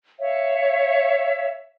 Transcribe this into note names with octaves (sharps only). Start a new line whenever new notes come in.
C#5 E5 F5